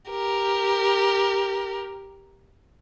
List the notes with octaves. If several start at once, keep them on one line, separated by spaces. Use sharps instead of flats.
G4 A#4